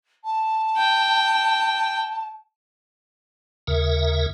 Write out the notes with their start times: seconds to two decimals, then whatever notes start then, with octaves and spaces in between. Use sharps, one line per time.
0.24 A5
0.77 G5
3.67 D#2 C#3 A#4 E5